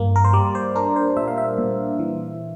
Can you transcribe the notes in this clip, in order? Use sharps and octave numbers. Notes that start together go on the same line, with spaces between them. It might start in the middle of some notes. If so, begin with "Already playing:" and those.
Already playing: G2 F3 A#3
A#4
C5
G3 D5
C5
D4 A#4
C5
A#2 E5
F5
E5
A#2
E3